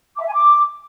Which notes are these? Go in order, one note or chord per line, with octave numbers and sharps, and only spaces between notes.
D6
E5
G#5
D6